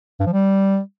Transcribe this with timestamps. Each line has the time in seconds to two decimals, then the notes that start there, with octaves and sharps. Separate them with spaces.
0.20 G2
0.26 F3
0.33 G3